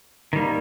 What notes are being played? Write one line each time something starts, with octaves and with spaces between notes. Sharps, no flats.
D#3 G3 A#3